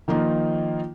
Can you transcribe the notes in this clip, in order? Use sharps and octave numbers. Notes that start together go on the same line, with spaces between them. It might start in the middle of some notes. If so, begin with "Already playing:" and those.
D#3 F3 A#3 D#4 F4